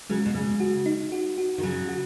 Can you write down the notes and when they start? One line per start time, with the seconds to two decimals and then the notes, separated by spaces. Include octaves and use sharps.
0.10 C#3 F#3 G#3
0.26 B2
0.34 C#3 G#3
0.60 F#4
0.86 D#4
1.12 F#4
1.38 F#4
1.58 D#3
1.63 C#3 F#3 F#4
1.89 F#4